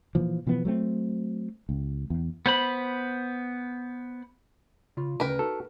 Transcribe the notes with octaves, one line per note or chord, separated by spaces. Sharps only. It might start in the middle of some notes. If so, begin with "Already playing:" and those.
A#2 E3 F3
B2 E3 F3 B3
F#3 A3 C4
C#2
E2
B3 C5 B5
C#3 F4
D2 C#3 A#4 B4 G5
D#4 F#4 A4